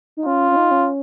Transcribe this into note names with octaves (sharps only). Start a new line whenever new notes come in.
D#4
C#4 F4
C#4
D#4
C#4